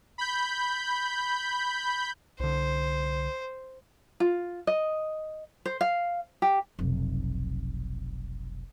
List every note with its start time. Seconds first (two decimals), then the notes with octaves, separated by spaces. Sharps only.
0.18 B5 G6
2.40 C2 D3 C5
4.20 F4
4.67 D#5
5.65 C5
5.81 F5
6.42 G4
6.79 F1 B1